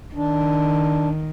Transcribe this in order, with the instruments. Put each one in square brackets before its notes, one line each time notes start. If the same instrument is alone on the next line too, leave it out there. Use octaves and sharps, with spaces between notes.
[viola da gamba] D#3 [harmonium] D4